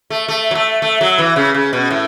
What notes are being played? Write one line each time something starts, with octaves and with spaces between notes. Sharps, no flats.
A3
A3
F#3
A3
A3
F#3
E3
C#3
C#3
B2
A2